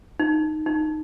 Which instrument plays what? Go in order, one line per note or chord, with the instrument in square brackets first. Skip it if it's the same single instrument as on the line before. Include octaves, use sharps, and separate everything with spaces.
[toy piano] D#4
D#4